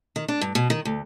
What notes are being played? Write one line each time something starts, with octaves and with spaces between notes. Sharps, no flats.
D#3
D4
G2
B2
D#3
D2